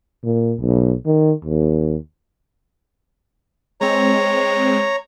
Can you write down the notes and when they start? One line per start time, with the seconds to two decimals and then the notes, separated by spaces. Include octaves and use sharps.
0.24 A#2
0.59 B1
1.06 D#3
1.45 D#2
3.81 G#3 C4 C#5 A#5